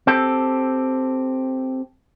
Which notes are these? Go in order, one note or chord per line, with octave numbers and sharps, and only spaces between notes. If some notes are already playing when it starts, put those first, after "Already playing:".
C4 G4 A4